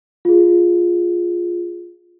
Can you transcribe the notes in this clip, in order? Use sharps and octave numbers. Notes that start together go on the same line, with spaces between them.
F4 G#4